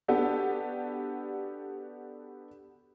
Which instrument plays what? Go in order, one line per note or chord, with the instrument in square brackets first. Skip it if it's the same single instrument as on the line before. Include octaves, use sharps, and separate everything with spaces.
[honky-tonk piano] B3 D4 F#4 G4 A4